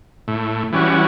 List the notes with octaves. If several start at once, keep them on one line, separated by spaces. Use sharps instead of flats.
A2
E3 G3 C#4 F#4